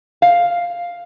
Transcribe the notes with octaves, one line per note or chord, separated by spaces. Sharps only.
F5